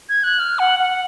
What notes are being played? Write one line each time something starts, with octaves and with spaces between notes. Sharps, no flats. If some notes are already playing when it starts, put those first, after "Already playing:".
G#6
F#6
F6
F#5
F#5